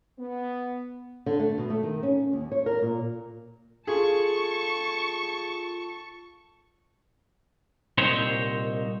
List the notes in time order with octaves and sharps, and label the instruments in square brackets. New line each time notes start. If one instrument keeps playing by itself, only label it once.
[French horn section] B3
[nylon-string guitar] D3
A3
B2
A3
D#3
C#4
D#2
C#5
A#4
A#2
[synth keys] F4 A4 [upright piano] G#4 [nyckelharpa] A5 [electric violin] C#6 C#7
[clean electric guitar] C2 A#2 C4 D#4 C5 C#5